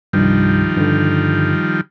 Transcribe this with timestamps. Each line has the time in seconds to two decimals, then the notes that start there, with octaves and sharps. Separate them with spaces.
0.13 C2 G2 D#3 F3 G3
0.77 G2 D3